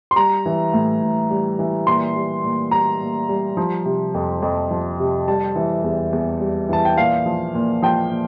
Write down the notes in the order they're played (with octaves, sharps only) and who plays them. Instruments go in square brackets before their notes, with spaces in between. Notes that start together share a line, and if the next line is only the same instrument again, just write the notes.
[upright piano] C6
G3 A#5
E3
A2
A2
G3
E3
A#2 C6
G3
A#2
G3 A#5
A#2
G3
F3
C3
F2
F2
F3
C3
G3 A5
E3
E2
E2
G3
E3 A5
G5
A#2 F5
F3
A#2
F3 G5
A#2